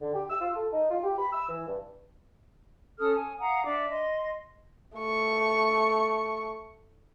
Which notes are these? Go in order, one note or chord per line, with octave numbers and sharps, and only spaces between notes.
D3
G4
E6
F4
A4
D#4
F4
G4
B5
E6
E3
G2
C#4 A4 D#6 F6
G#5
F5 F#5 A#5 D#6
D4 D5 E5 D6
D#5 C6
A3 C#6